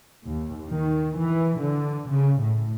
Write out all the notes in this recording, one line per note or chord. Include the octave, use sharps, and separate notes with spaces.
D#2
D#3
E3
D3
C#3
A2